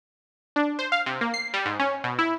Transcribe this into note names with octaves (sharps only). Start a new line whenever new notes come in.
D4
C5
F5
C3
A#3
C7
G3
G#2
C#4
B2
E4